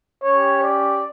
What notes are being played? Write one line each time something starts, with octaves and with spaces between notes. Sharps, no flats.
C#4 G4 C#5
D5